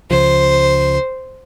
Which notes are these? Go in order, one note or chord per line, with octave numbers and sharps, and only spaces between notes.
C#2 C#3 F3 C5